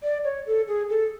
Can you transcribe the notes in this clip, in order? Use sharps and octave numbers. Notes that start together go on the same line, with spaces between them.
D5
C#5
A4
G#4
A4